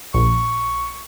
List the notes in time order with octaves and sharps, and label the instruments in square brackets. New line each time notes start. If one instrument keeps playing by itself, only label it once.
[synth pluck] A#1 [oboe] C#6